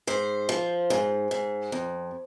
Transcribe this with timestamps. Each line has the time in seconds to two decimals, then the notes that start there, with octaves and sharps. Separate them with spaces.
0.07 G#2 C5
0.49 F3
0.90 G#2
1.31 G#2
1.72 F2